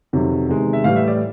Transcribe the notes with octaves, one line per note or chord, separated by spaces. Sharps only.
F2 C3 D#3 F#3
E2 C3 D#3 G#3
E5
A2 E3 G3 F5
E5
D5